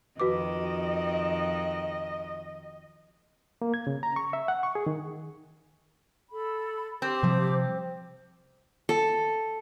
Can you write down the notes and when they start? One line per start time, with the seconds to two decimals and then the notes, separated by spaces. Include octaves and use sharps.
0.20 F2 D#3 F#4 B4 D#5 D6
3.62 A#3
3.74 G#6
3.87 C#3
4.03 A#5
4.16 C#6
4.33 E5
4.48 F#5
4.63 C#6
4.75 G#4
4.87 D#3
6.29 A4 B5
7.02 C4 G4 C5 D6
7.23 C3 F3 G3
8.89 A4